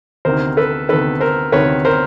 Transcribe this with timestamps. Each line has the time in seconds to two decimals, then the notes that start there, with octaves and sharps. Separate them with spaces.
0.25 D2 C3 D#3 A#4 C5
0.57 A4 B4
0.89 D2 C3 D#3 A4 B4
1.20 A#4 C5
1.52 D2 C3 D#3 B4 C#5
1.85 A#4 C5